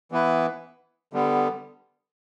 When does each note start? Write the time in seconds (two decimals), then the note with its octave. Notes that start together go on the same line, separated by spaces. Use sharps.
0.12 E3 B3 E4 B4
1.13 D3 G3 B3